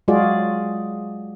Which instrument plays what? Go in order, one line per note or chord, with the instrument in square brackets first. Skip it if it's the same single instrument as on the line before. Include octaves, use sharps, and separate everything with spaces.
[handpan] F#3 G#3 F4 F#4 G#4 D5